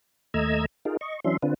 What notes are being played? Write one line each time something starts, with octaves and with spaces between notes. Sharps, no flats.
D#2 A3 D#5 A#5 E6 G#6
D#4 F4 G#4 A#4
D#5 C#6
E3 F#3 C#4 D4 E5 C6
D3 C4 D4 F4 B4